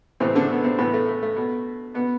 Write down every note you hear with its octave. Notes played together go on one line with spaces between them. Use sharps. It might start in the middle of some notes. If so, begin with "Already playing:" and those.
A2 C3 E3 C4
D3 D4
B3
C3 C4
A2 E3 B3
A3
A3
A3
B2
B2 B3